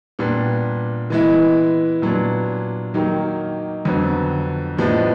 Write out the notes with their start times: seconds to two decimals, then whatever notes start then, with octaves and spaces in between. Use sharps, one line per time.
0.19 A#2 G3 B3 D4
1.10 E3 G#3 B3 E4
2.02 A#2 F#3 B3 D4
2.94 D#3 F#3 A#3 D#4 G4
3.85 F2 D3 F#3 B3
4.77 A2 F3 G#3 B3 D4